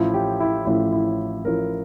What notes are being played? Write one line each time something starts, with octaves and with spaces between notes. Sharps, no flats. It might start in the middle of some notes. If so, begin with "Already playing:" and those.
Already playing: A1 A2 F3 E4
G4
E4
A1 A2 F3 E4
E4
A1 A2 F3 A#4